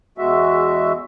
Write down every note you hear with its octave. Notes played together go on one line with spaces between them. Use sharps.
E2 G#3 F#4 E5